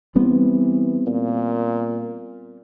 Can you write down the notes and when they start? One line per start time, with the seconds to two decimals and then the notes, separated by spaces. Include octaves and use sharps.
0.16 E3 G3 B3 C4
1.07 A#2